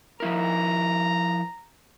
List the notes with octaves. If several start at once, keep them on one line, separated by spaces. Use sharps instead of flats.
F3 E4 A#4 A#5